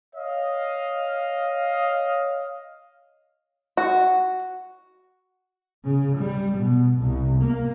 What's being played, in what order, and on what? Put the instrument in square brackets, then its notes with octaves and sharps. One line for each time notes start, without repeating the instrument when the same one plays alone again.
[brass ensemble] C#5 D#5 F5
[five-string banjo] F#4
[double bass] C#3
G3
B2
C2
A#3